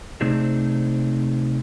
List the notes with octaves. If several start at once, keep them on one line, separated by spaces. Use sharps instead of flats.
C3 A3 C4 D4 D#4 G#4